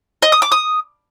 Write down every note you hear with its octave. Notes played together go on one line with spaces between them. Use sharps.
D#5
D#6
D6
D#6